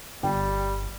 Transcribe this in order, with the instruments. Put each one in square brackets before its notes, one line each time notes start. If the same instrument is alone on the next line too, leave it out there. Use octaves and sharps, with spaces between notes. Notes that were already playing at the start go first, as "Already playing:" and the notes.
[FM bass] G1 [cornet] G3 [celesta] G5